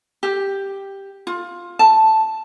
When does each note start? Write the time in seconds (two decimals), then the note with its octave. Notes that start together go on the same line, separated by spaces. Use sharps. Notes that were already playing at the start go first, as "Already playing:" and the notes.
0.23 G4
1.27 F4
1.79 A5